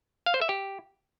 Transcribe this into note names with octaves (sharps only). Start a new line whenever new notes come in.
F5
C5
E5
G4